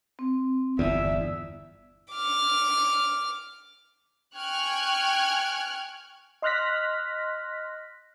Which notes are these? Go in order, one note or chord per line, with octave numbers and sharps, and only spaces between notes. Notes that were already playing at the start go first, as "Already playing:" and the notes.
C4
G1 E2 D5 E5 E6
D6 F6
G5 G#5 C#6 F6 F#6 G#6
D#5 C6 F6 F#6 A#6 B6